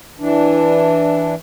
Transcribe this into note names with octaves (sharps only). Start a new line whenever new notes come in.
E3 D4